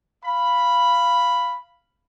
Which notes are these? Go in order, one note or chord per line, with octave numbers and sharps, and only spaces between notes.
F5 B5